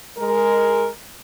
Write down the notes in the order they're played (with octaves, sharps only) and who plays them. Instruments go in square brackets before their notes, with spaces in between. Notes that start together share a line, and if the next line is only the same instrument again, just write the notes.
[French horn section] G#3 A#4